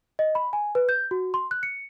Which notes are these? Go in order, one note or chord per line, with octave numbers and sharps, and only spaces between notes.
D#5
B5
G#5
B4
G6
F#4
C6
F#6
C#7